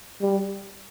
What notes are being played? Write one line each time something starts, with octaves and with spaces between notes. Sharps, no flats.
G3